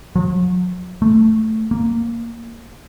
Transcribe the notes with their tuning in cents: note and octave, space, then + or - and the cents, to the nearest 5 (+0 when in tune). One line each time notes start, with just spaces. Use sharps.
F#3 -40
A3 +5
A#3 -5